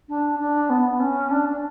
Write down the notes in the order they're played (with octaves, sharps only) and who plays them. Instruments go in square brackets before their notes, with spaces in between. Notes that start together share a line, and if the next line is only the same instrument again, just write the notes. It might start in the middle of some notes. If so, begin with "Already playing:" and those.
[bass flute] D4
D4
B3
C#4
D4
D4